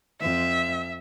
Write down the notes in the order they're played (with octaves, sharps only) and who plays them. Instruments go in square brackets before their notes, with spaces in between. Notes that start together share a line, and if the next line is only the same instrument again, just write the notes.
[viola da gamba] F2 [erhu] E5